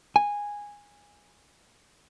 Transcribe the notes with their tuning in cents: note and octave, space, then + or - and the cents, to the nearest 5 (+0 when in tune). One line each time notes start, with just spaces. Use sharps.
G#5 -10